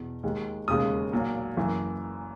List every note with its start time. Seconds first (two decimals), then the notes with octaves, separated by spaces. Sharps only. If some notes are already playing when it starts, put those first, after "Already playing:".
Already playing: E2 B2
0.23 D#2 D#3 G#3
0.68 E1 D#2 C#3 G#3 D#6
1.13 B1 A#2 F#3
1.57 F#1 F#2 E3